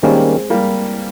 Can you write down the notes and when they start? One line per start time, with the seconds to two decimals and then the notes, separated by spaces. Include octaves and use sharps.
0.02 D#3 G3 G#3 A#3 C4 C#4
0.50 G3 A#3